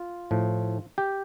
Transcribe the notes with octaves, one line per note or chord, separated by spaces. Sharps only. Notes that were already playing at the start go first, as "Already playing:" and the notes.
Already playing: F4
A2 F3
G4